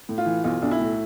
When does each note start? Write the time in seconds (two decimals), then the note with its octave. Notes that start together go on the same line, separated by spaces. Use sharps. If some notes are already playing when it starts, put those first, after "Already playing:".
0.09 A2
0.18 F4
0.26 E3
0.44 B1 F4
0.62 B1 D4
0.71 E4
0.80 A2